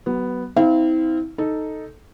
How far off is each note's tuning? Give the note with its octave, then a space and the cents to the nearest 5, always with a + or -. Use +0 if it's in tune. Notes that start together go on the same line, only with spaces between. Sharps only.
F#3 +35 B3 +0
C4 -20 E4 -40 F5 -25
D#4 +0 A4 +0